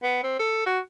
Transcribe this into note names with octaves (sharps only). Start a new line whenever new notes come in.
B3
C4
A4
F#4